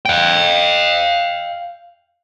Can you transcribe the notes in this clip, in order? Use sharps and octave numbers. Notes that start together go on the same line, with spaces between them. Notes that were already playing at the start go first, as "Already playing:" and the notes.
F5 G5